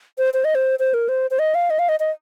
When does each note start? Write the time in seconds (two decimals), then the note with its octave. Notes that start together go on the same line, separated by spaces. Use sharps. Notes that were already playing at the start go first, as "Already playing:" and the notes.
0.18 C5
0.34 C5
0.45 D#5
0.55 C5
0.79 C5
0.94 A#4
1.09 C5
1.31 C5
1.39 D#5
1.55 F5
1.70 D#5
1.79 F5
1.89 D#5
2.00 D#5